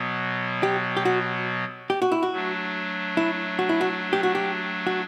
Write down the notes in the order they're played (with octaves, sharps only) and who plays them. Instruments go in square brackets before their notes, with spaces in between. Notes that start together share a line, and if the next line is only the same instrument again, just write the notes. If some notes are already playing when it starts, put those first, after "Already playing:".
Already playing: [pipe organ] B2 F#3 B3
[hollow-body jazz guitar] G4
G4
F#4
G4
F#4
E4
F#4
[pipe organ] F#3 A3 D4
[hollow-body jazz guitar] E4
F#4
E4
F#4
G4
F#4
G4
F#4